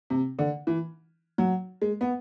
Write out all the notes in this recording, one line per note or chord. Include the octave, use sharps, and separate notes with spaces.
C3
D3
E3
F#3
G#3
B3